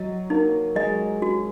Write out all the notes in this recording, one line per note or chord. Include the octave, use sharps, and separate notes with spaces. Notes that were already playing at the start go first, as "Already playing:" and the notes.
Already playing: F#3 D#5
A#3 D#4
G#3 D#5
F#4